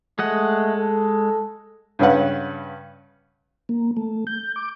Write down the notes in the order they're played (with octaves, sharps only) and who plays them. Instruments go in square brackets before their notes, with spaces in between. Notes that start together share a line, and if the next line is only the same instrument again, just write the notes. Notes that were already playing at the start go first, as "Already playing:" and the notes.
[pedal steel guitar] G#3 D#5 F#5 [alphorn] A3
[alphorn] A4
[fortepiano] G2 C#3 C#4 B4 F#5
[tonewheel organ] A#3
A3
G6
D6